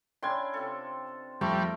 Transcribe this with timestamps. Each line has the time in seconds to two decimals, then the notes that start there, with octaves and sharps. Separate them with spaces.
0.23 C#4 D4 E4 D5 G5 C6 G#6
0.53 C3 F4 A4
1.41 F2 G3 A3 A#4 E5